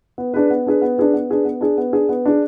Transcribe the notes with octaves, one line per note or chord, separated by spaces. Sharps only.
B3
D4 G#4 B4
B3
D4 G#4 B4
B3
D4 G#4 B4
B3
D4 G#4 B4
B3
D4 G#4
B3
D4 G#4
B3
D4 G#4